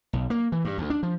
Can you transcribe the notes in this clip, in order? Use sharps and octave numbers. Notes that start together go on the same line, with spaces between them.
B1
A#3
E3
G2
D2
D4
F3